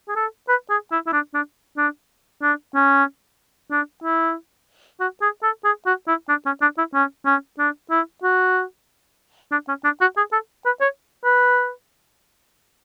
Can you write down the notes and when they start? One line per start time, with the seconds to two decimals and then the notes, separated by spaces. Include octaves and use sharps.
0.08 G#4
0.16 A4
0.49 B4
0.70 G#4
0.92 E4
1.07 E4
1.13 D4
1.34 D4
1.77 D4
2.42 D4
2.75 C#4
3.71 D4
4.04 E4
5.00 F#4
5.22 G#4
5.43 A4
5.64 G#4
5.86 F#4
6.08 E4
6.29 D4
6.46 C#4
6.62 D4
6.78 E4
6.94 C#4
7.26 C#4
7.59 D4
7.91 E4
8.23 F#4
9.52 D4
9.68 C#4
9.84 D4
10.01 F#4
10.17 G#4
10.33 A4
10.66 B4
10.81 C#5
11.25 B4